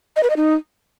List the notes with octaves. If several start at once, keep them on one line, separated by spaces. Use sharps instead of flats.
D#5
B4
D#5
D#4